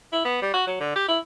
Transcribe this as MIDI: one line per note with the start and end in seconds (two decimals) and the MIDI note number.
0.13 0.24 64
0.25 0.39 59
0.42 0.50 55
0.54 0.64 66
0.67 0.80 54
0.80 0.93 50
0.96 1.04 67
1.08 1.19 64